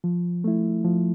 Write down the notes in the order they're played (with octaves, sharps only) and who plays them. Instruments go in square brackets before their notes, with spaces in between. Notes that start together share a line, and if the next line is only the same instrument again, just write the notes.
[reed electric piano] F3
A3 E4
F3